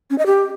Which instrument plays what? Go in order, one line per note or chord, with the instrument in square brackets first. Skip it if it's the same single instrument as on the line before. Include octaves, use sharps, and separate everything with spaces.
[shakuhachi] C#4
D#5
G4